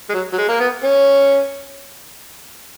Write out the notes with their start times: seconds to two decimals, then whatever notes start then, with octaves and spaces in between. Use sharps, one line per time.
0.09 G#3
0.14 F#3
0.33 F#3
0.38 G#3
0.48 A#3
0.60 B3
0.84 C#4